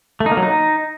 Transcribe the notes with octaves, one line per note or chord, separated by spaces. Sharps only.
A3
D#4
A#3
F#3
D#4